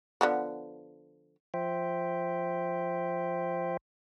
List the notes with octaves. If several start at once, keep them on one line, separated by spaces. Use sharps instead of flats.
D3 F3 B3
F3 C5 E5 G5